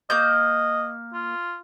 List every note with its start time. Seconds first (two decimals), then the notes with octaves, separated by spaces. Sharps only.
0.10 A#3 D#5 G6
1.13 F4